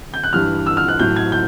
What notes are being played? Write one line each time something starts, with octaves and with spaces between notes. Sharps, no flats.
G6
F#6
G2 E3 G3 F6
E6
F6
F#6
A2 F#3 G6
G#6
G6